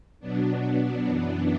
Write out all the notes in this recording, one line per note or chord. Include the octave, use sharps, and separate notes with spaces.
B2 F#3 B3 D4
F#2 E3 B3 D4